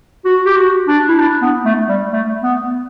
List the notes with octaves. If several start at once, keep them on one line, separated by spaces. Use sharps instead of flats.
F#4
G4
F#4
D4
E4
D4
B3
A3
G3
A3
B3